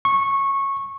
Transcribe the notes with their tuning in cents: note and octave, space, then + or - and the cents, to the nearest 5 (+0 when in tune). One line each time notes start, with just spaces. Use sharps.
C#6 -15